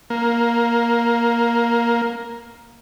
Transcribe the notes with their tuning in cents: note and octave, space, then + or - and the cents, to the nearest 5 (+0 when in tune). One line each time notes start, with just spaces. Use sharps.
A#3 +10